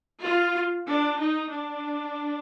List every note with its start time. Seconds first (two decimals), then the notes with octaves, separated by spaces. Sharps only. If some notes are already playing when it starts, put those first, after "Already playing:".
0.23 F4
0.85 D4
1.16 D#4
1.46 D4